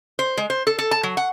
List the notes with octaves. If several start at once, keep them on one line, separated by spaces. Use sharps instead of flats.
C5
G#3
C5
A4
A4
A5
F#3
F#5